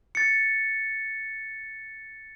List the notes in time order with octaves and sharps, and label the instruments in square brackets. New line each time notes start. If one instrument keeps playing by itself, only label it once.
[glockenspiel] A6 C#7